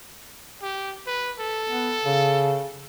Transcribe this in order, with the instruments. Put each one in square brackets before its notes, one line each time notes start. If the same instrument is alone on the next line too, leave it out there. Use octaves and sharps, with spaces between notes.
[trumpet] G4
B4
A4
[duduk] B3
C#3